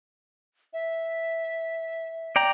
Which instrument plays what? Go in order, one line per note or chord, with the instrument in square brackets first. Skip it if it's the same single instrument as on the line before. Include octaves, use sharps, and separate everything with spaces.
[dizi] E5
[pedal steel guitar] D5 G5 A#5